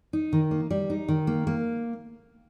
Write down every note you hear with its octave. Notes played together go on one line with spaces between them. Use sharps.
D#4
D#3
A#3
G3
D#4
D#3
A#3
A#3